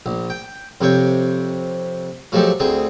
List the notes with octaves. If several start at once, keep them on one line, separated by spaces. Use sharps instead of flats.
A#1
G5
F2 C3 C#5 G5
F3 F#3 G#3 D#4 G4 A4
D2 C4 G#4 D#6